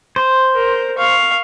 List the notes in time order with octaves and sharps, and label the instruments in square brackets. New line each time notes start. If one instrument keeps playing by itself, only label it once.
[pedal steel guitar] C5
[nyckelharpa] A#4
F5 C#6